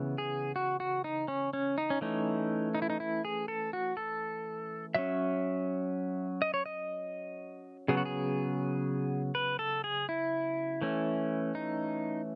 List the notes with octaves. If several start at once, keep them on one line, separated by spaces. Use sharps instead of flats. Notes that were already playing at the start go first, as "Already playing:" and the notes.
Already playing: C#3 E3 B3
G#4
F#4
F#4
D#4
C#4
C#4
D#4
C#4
E3 A3 C#4 D#4
D#4
E4
D#4
E4
G#4
A4
F#4
A4
F#3 C#4 E5
D#5
C#5
D#5
C#3 F#3 B3 G#4
F#4
G#4
B4
A4
G#4
E4
E3 A3 C#4
D#4